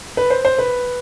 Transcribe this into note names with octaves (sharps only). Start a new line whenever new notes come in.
B4
C5
C5
B4